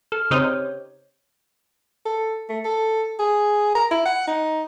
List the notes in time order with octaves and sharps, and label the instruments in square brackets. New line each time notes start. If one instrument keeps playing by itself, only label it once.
[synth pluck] A4 [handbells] F6
[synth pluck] C#3 C4 D#4 [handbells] G4 C5 C#5
[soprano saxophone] A4
A3
A4
G#4
A#5
E4
F#5
D#4